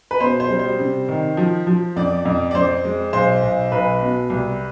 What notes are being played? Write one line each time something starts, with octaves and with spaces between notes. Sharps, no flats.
B4
B2 C5
C5
G3
C5
C3
D#3
F3
F3
F2 D5
F2
D5
F2 C5
G#3
B1 C5
B1
B1 B4
B2
C2